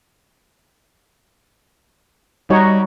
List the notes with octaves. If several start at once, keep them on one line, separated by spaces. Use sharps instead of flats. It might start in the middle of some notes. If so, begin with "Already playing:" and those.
G3 D#4 F#4 C#5